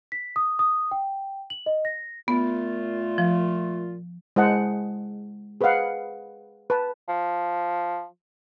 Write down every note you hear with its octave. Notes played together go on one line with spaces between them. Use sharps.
B6
D#6
D#6
G5
F#7
D#5
A#6
A#2 A3 B3 F4
F3
G#3 E4 C5 D#5 F#5 A5
G#4 B4 C5 D#5 F5 F#5
B4 A5
F3